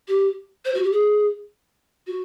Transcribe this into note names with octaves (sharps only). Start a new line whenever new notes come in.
G4
C5
F#4
G4
G#4
F#4